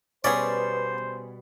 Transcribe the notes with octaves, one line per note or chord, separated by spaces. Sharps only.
B2 G3 B3 C#4 G#4 C5 D5